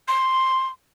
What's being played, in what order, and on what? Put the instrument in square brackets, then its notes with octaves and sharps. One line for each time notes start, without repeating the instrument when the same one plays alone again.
[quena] C6